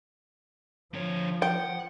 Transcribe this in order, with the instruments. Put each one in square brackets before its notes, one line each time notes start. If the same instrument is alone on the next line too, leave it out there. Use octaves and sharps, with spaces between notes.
[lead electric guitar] D3 C#5 [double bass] F3
[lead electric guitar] F#5 [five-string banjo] G5